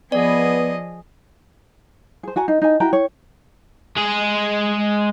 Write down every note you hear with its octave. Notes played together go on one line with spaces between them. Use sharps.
F3 B3 G#4 D5 D#5
G#4 C5
F#4 F#5 G#5 A#5
D#4
D#4 G#5
E4 F#4 G5 A#5
C#5
G#3 G#4